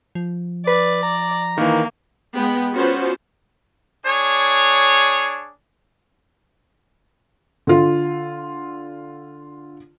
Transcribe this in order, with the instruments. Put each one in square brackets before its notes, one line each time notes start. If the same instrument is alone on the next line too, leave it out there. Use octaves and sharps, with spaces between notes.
[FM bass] F3
[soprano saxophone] B4 [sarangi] D5
[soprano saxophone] A#5
[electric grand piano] D#3 E3 [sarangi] A#3
[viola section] G#3 B3 G5
B3 C#4 F4 F#4 C5
[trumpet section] D4 G#4 C#5
[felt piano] D3 F4